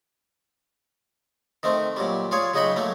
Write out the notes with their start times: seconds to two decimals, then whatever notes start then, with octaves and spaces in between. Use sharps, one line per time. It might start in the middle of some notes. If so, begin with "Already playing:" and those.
1.63 D#3 A3 C4
1.96 A#2 F#3 G3
2.31 F4 G#4 C#5 D5
2.54 C#3 F#3 D#4 F#4 G5 B5
2.76 F#3 A3 A#3